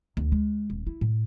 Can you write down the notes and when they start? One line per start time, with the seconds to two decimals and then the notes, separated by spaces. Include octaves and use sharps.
0.17 D2
0.32 G#3
0.70 D#1
0.87 E4
1.01 A2